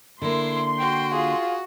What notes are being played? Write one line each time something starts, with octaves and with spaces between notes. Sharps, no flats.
D3 A#3 E4 C6
F#4 G5
F4 G#4